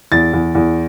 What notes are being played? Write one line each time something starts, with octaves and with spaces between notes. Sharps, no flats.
E2 A6
E2
E2